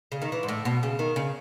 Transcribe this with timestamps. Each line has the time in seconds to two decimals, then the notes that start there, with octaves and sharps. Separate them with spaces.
0.12 C#3
0.22 D#3
0.32 E3
0.43 G#2
0.48 A2
0.65 B2
0.83 C#3
0.99 D#3
1.16 C#3